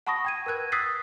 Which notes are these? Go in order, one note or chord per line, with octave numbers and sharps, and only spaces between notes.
F#5 A5 B5 C#6 D#6 A#6
G5 G#6 D#7
A#4 B4 F#6 G#6
D#6 E6 F#6 A6 B6 C7